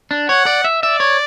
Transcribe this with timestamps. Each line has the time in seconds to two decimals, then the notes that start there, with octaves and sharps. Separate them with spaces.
0.11 D4
0.29 C#5 F#5
0.46 D5
0.64 E5
0.82 D5 E5
1.00 C#5